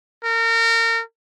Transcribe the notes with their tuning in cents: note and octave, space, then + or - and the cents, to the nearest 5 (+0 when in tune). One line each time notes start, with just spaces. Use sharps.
A#4 -30